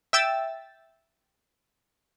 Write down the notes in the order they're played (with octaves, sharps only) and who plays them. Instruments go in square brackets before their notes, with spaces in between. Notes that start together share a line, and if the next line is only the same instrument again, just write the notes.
[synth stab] E5 G5 E6 A6